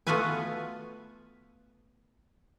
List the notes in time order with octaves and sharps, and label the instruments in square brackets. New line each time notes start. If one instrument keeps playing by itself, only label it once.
[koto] A3 B3 F4 F#4 B4 G#5